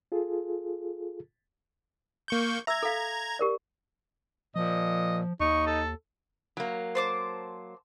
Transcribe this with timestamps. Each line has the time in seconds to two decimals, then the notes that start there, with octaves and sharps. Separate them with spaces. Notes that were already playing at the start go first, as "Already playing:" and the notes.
0.12 F4 G#4 A4
2.28 A#3 C#6 G6
2.67 E5 A#5 E6 G#6
2.83 A4 F5
3.39 G4 A#4 D5
4.56 A#2 F3 D#5
5.40 D#2 D#4 C#6
5.67 A4
6.57 F#3 A#3
6.95 C5 A5 D6